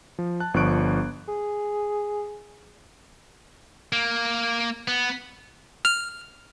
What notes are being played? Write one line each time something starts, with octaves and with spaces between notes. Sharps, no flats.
F3
A5 F#6
G1 F3 D4 C#6 F#6 D7
G#4
A#3
B3
F6